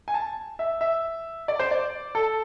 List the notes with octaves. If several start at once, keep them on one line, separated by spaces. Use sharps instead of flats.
G#5
A5
E5
E5
D5
C5
D5
A4